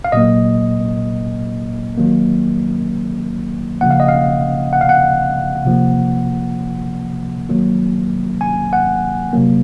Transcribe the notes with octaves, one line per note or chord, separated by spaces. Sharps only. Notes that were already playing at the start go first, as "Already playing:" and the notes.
F5
A#2 F#3 A#3 D#5
D#3 F#3 A#3
C#3 F3 A#3 F#5
F5
D#5
F5
F#5
F5
F#5
C3 F3 A#3
D#3 F#3 A#3
G#5
F#5
C3 F#3 A#3